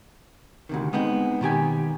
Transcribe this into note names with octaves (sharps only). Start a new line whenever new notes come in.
D2 C3 D#3
G#3 B3 C4 D#4
B2 D#3 G4 G#5